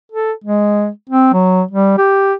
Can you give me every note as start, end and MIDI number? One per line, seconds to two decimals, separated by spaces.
0.12 0.33 69
0.44 0.89 56
1.10 1.30 60
1.33 1.62 54
1.71 1.95 55
1.98 2.34 67